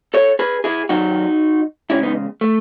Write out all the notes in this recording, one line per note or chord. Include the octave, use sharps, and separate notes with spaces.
A4 C#5
G#4 B4
E4 G#4
F#2 D#3 F#3 D#4 F#4
E2 C#3 G#3 C#4 E4
B3 D#4
A3